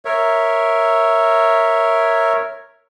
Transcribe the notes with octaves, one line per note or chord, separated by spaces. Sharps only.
A#4 C#5 E5